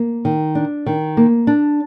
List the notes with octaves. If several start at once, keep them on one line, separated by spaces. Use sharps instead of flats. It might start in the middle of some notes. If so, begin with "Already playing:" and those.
Already playing: A#3
D#3
D4
D#3
A#3
D4